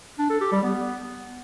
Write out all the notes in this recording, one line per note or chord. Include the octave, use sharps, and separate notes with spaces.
D4
A4
G4
G3
B3